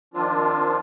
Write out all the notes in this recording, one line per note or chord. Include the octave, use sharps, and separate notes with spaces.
D#3 F3 C4 D4 F4